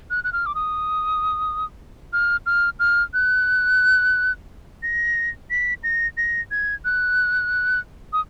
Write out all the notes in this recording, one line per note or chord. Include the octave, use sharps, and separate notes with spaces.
F#6
F#6
F6
D6
D#6
F6
F6
F6
F#6
A#6
B6
A#6
A#6
G#6
F#6
D#6